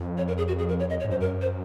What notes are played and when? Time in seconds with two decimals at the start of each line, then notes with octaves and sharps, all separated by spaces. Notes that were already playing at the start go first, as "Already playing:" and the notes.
Already playing: F2
0.17 C#5
0.28 A#4
0.38 G#4
0.48 F#4
0.59 G#4
0.69 A#4
0.80 C#5
0.90 D#5
1.00 C#5
1.04 G#2
1.11 F#2 C5
1.21 A#4
1.41 C5